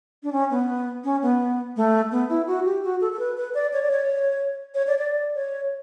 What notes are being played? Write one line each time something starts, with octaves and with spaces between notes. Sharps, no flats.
D4
C#4
B3
C#4
B3
A3
B3
E4
F#4
G4
F#4
A4
A4
B4
B4
D5
C#5
D5
C#5
C#5
D5
D5
C#5